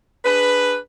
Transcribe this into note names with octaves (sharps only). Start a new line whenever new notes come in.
D4 G#4 B4